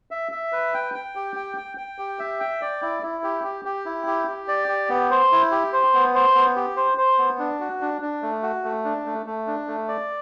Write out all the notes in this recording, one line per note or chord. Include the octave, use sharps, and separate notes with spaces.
E5
E5
B4
G5
G5
G4
G5
G5
G5
G4
E5
G5
D5
E4
E4
G4
G4
G4
E4
G4
G4
D5
G4
B3
C5
E4
G4
C5
B3
C5
B3
G4
C5
C5
B3
D4
F#4
D4
D4
A3
F#4
A3
D4
A3
A3
D4
A3
D5